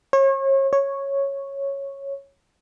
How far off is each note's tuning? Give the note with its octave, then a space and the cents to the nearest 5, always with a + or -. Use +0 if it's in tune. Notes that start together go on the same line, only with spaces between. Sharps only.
C#5 -35
C#5 -5